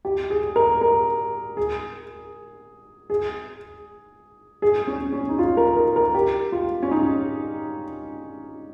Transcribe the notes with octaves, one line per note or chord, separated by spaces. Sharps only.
G4
G#4
A#4
A#4
G#4
G#4
G#4
C#4
C#4
D#4
F4
A#4
A#4
A#4
G4
F4
C#4
D#4